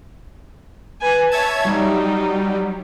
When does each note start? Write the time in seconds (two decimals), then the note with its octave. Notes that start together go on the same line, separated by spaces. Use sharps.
1.01 B4 G#5
1.32 C#5 E5 A5 G#6
1.65 F#3 G3 D#4